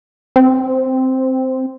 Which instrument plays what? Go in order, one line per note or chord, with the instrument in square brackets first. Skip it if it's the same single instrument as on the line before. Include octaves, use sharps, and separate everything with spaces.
[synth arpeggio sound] C4